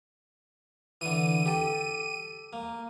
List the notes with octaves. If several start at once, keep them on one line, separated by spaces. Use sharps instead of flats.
D3 E3 D#7
G4 A4
A#3